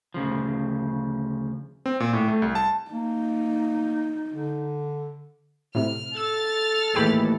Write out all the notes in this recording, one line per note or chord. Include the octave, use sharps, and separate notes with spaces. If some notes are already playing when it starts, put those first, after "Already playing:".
D2 C#3 F3
C4
A#2
A2
A3
C2
A5
A#3 D#4
D3
A2 C3 F6
A4 E6 F6 A6
D#2 A2 E3 G#4 G5 B5